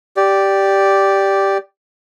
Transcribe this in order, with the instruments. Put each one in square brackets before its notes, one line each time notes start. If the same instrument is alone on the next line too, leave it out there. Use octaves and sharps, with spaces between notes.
[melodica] G4 D5